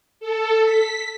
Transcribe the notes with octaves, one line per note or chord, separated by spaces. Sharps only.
A4
B6